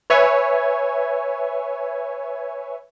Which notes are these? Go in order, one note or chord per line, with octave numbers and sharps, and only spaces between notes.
B4 C#5 E5 G#5